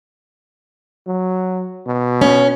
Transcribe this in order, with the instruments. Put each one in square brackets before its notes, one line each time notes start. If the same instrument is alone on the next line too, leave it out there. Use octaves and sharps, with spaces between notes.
[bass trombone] F#3
B2
[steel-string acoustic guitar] C#4